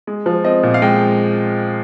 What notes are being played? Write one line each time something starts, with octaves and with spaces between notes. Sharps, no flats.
G#3
F3
C4 D#5
A#2
F5
G#3 G5